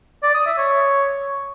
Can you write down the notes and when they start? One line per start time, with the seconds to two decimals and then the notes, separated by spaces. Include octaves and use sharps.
0.23 D5
0.34 D#6
0.46 E5
0.58 C#5